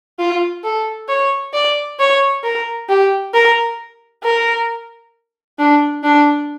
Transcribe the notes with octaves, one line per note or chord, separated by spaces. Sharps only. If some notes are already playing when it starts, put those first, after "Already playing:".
F4
A4
C#5
D5
C#5
A#4
G4
A#4
A#4
D4
D4